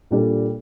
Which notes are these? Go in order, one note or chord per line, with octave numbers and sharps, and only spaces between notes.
A#2 G3 D4 A4